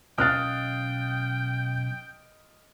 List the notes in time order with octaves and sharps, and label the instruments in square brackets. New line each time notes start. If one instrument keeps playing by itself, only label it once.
[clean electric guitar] B1 C#4 F5 [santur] D#5 [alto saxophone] G5 [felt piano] F6 F#6 A6